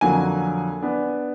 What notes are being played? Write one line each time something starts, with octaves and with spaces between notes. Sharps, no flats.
F2 D3 F#3 A#3 G#5
B3 D4